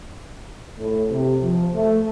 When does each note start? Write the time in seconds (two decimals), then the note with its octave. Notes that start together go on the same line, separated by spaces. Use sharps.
0.79 A2
1.10 C3
1.42 F3
1.74 A3